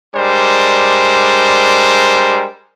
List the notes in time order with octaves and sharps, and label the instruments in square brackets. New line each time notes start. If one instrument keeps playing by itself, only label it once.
[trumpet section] G3 G#3 D4 A#4 C5